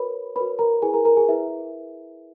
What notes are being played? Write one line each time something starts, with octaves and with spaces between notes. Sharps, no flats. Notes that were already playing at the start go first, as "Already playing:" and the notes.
Already playing: F#4 A#4 B4 C#5 B5
F#4 A#4 B4 C#5 B5
A#4 A#5
E4 G#4 B4 G#5
A#4 A#5
A#4 A#5
G#4 G#5
E4 G#4 B4 E5